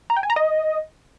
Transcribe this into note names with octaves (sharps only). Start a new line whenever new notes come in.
A#5
G5
G#5
A#5
D#5